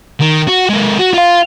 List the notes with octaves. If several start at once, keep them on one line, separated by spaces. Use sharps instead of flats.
D#3
F#4
G#3 A#3
F#4
F4 F5